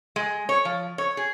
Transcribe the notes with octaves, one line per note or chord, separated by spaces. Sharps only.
G#3
C#5
F3
C#5
G#4